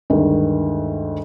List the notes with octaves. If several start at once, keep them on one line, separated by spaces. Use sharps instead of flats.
D2 G2 D3 D#3 G#3